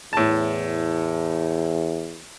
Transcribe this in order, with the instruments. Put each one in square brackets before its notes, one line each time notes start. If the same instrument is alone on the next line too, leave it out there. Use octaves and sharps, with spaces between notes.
[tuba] E2 [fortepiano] A2 A5